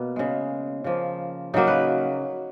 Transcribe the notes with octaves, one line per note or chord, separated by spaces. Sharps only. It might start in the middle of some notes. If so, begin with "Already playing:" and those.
Already playing: B2 A#3 B3
C#3 G#3
C#3 F3 A#3
C#3 F#3 A#3 D#4
B4